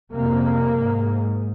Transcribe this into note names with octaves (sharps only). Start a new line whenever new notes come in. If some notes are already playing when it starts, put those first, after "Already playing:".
F2 C3 A#3
G#2